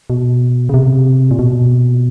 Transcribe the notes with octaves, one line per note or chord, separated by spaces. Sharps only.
B2
C#3
C3
A#2
B2